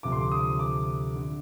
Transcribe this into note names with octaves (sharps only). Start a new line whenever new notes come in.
D2 C3 F3 D6
C6
D6
D#6
D6
D3